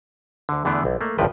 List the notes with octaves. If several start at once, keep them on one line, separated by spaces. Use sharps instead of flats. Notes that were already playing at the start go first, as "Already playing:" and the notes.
D2 D3
E2 D3 E3 A3 B3 D4
B1
A3 A#3
G#1 C#2 G2 F3 B4 G5